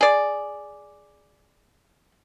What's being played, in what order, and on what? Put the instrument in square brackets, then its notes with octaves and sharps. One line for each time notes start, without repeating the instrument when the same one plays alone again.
[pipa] G#4 D5